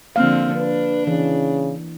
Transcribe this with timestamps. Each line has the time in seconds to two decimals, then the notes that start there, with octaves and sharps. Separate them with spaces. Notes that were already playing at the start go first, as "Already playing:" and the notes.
0.16 D3 F3 A#3 C4 F5
0.57 D4 B4
1.07 C#3 E3